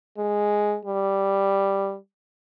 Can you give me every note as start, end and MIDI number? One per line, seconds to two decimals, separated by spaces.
0.18 0.77 56
0.85 1.97 55